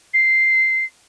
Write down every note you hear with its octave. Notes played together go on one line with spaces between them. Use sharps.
C7